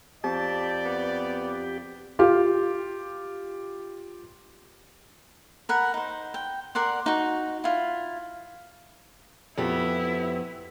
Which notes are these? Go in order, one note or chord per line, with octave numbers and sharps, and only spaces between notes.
F2 G4 D5 A5
B3
F4 G4
A#4 F#5 B5
D#4 C5
G5
A#4 D5 F#5 C6
D#4 F#4
E4 F4
F2 B3 E4 G4